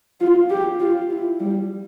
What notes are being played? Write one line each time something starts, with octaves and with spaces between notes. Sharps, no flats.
F4
G4
F4
E4
G3